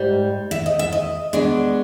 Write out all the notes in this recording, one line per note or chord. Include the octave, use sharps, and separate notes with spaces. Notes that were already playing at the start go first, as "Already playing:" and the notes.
Already playing: G#2 G3
E5
D#5
E5
D#5
B2 G#3 B3 D4